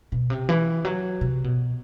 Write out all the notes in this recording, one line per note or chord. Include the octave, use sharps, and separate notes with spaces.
B2
C3
E3
F#3
C3
B2